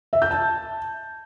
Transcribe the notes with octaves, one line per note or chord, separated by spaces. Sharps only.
E5
G6
A5